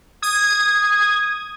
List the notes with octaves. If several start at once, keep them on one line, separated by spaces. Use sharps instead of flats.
D#6 G#6